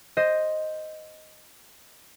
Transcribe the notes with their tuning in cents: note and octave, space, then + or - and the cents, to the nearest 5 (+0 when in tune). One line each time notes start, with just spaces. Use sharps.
C5 +0 D#5 +0